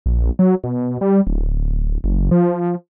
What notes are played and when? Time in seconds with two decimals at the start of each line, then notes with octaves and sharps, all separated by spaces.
0.06 A#1
0.39 F#3
0.64 B2
1.01 G3
1.27 D1
2.04 F#1
2.31 F3